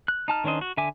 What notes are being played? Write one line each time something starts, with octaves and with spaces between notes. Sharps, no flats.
F#6
D#4 A5 F6
D#3 C#4 D4 C5 D#5
F#4
D3 E5 G#5 D6